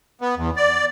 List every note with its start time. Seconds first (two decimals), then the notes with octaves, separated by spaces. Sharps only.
0.21 B3
0.37 E2
0.56 D5